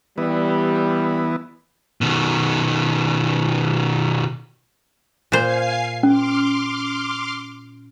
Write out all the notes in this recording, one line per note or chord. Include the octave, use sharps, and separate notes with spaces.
E3 G3 B3
B2 D#3
A#2 C5 F5 G#5 C7
C#4 C6 D6 F6